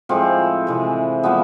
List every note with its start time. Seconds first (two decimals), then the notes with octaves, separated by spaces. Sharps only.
0.09 A2 F3 G#3 C4
0.67 C3 E3 G#3
1.23 A#2 F3 G#3 B3